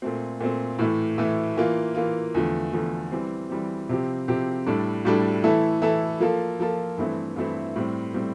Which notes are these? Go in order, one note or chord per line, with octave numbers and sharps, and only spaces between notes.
A#2 A3 C4
A#2 A3 C4
A2 E3 A3
A2 E3 A3
E3 A#3 F4
E3 A#3 F4
E2 D3 F3 A3
E2 D3 F3 A3
E3 G3 C4
E3 G3 C4
C3 F3 C4 G4
C3 F3 C4 G4
A2 G3 D4 A4
A2 G3 D4 A4
E3 A3 E4 A4
E3 A3 E4 A4
F3 A#3 F4 A4
F3 A#3 F4 A4
G2 E3 A3 C4 E4
G2 E3 A3 C4 E4
A2 G3 C4
A2 G3 C4